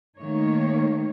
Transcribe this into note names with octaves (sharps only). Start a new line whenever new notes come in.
D#3 A3 A#3 D#4 C#5